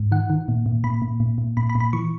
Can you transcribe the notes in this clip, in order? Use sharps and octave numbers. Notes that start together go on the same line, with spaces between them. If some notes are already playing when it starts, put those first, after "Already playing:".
Already playing: G#2
D#3 F#5
D#3
A#2
A#2
A#2 B5
A#2
A#2
A#2
A#2 B5
B5
A#2
B5
E3 C#6